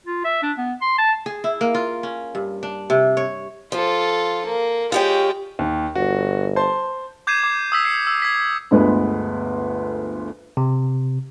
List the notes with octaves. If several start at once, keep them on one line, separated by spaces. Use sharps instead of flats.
F4
E5
D4
B3
C6
A5
G#4
E4
A#3
F4
C#4
G2
D4
C3
C#5
F3 F4 A4
A#3
G#3 F4 G4 C#5 G5
D#2
G1 F#4
C5 A5 C6
D6 G6 G#6 C7 D#7 E7
D6 C7
D#6 E6 B6
C7 C#7
E6
G#6 B6
G1 D2 G#3 B3 B4
C3